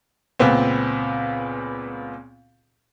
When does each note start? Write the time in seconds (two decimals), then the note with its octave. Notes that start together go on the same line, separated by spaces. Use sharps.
0.39 C#2 A#2 B3 C4